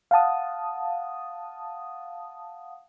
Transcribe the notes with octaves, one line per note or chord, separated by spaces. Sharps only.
F5 F#5 A5 D#6